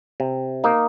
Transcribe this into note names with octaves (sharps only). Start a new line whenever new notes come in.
C3
A#3 D#4